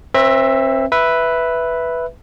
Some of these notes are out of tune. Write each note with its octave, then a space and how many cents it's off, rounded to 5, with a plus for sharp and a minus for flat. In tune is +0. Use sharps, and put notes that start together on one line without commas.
C4 +35 B4 +0 E5 +0
B4 +0 E5 +0